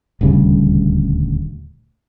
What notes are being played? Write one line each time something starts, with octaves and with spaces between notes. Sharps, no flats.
D#1 D2 C#3 G3